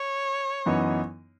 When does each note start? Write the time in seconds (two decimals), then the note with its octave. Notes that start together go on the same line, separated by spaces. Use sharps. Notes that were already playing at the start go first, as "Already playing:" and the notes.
Already playing: C#5
0.66 F#2 E3 B3 D#4